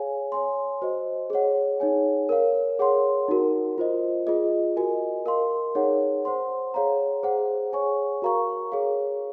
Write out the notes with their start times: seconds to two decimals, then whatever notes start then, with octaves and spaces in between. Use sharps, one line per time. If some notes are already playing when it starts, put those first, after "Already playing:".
Already playing: G#4 C#5 F5 G#5
0.32 C#5 G#5 C6
0.82 F#4 C5 D#5
1.30 G#4 C#5 F#5
1.80 D#4 G#4 C#5 G#5
2.29 A#4 C#5 F5
2.79 G#4 C#5 F#5 C6
3.28 D#4 F#4 A#4
3.78 F4 C5 D#5
4.27 F4 G#4 D#5
4.76 F#4 A#4 D#5 G#5
5.26 A#4 F5 C6
5.75 D#4 G#4 C#5 F#5
6.25 C5 F#5 C6
6.74 G#4 C#5 F5 A#5
7.23 G#4 C5 F#5
7.72 G#4 C#5 G#5 C#6
8.22 F#4 A#4 F5 A#5 C#6
8.72 G#4 C#5 F5